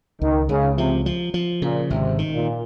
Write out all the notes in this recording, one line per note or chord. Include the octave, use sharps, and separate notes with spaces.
C#2 D#3
C#2 C#3
C3 F3
F3
F3
A#2 C#3
G#1 C3
D#3
A#2